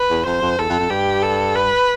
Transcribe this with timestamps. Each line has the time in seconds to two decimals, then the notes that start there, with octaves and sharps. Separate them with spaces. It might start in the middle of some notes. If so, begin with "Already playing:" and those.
Already playing: B4
0.10 E2
0.25 F2 C5
0.42 F2
0.58 E2 A4
0.69 F2
0.80 F2
0.90 G2 G4
1.23 A4
1.55 B4